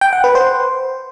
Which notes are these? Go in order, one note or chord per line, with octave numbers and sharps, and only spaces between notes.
G5
F#5
B4
C5